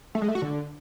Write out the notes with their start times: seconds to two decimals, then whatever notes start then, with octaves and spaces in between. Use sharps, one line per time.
0.15 A3
0.22 G#3
0.28 A3
0.35 F#4
0.42 D3